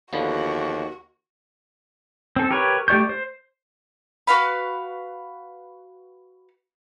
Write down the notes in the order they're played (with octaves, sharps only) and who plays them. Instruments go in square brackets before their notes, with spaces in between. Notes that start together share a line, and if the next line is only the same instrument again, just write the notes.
[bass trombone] D#2 [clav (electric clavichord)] D3 F3 B3 [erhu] F#4
[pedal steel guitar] C4 A4
G4 A#4 B4 C#5
A3 G4 D5 C#6 G6
C5
[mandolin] F#4 B4 F5 B5